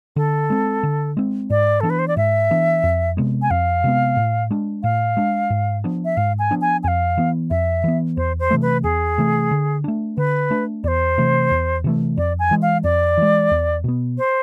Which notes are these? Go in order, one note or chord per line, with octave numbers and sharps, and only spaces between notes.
D3 A4
G#3 C4
D3
G#3 C4
G#2 D5
E3 B3 D4 A4
B4
C5
D5
G#2 E5
E3 B3 D4
F2
C3 G#3 B3
G#5
F2 F5
C3 G#3 B3
A2
G#3 D4
A2 F5
G#3 D4
G#2
F3 B3 D4
E5
G#2 F5
G#5
F3 B3 D4
G#5
F2 F5 G#5
E3 B3
F2 E5
E3 B3
E2 C5
C5
C3 E3 A3
B4
E2 G#4
C3 E3 A3
D3
A3 D4
D3 B4
A3 D4
E2 C5 D5
C3 E3 A3
E2
C3 E3 A3
F2 D5
G#5
E3 G#3
F5
F2 D5
E3 G#3
E2
B2 B3
C5